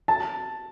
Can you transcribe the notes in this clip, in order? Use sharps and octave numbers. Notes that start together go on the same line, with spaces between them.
A5